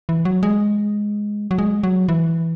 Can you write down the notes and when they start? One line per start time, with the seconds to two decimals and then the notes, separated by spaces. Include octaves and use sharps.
0.09 E3
0.25 F#3
0.43 G#3
1.51 F#3
1.59 G#3
1.83 F#3
2.08 E3